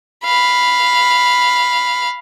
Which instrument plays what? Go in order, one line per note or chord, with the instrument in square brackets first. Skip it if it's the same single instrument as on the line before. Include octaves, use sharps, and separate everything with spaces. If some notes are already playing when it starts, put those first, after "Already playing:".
[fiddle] F5 B5